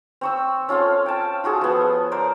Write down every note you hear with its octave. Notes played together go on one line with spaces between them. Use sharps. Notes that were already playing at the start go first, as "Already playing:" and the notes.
C4 C#6 E6
C#4 F4 A4 F5
G5 A5
F4 F#4 G#4 A4
F3 B3
A#4 C5 D5